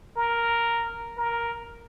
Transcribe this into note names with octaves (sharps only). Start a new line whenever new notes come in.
A#4
A#4